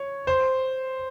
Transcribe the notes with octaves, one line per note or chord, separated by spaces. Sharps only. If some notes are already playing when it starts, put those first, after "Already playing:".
Already playing: C#5
C5